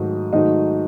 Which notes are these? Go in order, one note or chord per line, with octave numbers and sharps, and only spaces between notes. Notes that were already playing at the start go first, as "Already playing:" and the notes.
Already playing: G#2 D#3 F#3 A3 D#4 D#5
G#2 D#3 F#3 A3 D#4 D#5